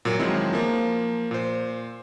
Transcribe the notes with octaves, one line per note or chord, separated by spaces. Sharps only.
A#2 F#3 A#3
D#3 F3 F#3 G#3 C4 E4
F3 A#3
A#2 C5